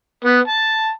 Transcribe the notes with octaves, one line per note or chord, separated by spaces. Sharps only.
B3
A5